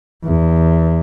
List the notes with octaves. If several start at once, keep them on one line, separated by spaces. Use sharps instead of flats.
E2